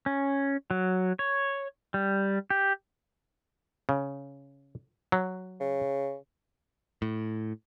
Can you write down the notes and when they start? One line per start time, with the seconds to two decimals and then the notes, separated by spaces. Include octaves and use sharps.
0.06 C#4
0.71 F#3
1.19 C#5
1.94 G3
2.50 G4
3.89 C#3
5.12 F#3
5.60 C#3
7.02 A2